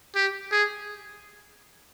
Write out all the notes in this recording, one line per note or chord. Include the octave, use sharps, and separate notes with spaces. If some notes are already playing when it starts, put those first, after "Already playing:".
G4
G#4